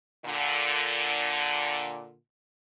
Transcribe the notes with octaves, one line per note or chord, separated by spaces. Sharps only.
A#2 D3